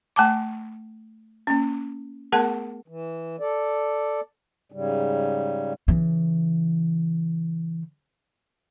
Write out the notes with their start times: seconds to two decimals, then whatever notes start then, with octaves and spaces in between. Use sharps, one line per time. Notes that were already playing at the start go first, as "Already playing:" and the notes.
0.16 A3 G#5 A5 D6
1.47 A#3 C#4
2.32 A3 B3 G#4 A#4 F#5 A5
2.88 E3
3.40 A4 D5
4.72 G#2 C#3 G3
5.88 C#3 E3